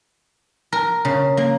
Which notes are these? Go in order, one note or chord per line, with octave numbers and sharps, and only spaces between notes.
A#4
C#3
A#3